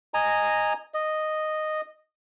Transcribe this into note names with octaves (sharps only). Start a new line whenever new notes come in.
D#5 G#5 A#5
D#5